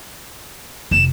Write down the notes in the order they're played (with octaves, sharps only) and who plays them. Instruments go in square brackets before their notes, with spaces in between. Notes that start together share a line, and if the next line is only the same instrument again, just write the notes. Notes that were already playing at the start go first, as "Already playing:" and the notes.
[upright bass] F1 [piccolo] E7